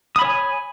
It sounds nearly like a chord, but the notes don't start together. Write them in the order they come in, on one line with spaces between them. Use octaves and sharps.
D#6 B5 C#5 G#5